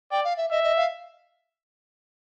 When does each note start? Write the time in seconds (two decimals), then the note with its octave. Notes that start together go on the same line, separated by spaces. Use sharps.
0.11 D5 G5
0.24 F5
0.37 E5
0.51 D#5 E5
0.64 D#5
0.77 F5